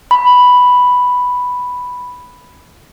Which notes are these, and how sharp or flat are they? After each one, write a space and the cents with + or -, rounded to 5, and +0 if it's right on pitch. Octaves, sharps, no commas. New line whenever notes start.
B5 +0